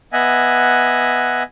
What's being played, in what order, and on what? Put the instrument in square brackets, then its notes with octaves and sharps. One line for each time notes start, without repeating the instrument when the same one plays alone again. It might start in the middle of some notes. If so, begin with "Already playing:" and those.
[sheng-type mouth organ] B3 D#5 E5 F#5 G#5